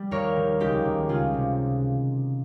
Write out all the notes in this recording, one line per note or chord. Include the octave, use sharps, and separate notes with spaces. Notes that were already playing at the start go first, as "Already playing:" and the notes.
Already playing: G3
D#2 A#4 C#5
D#3
C#2 D#4 G4
D#3
C#2 F4 G#4
C3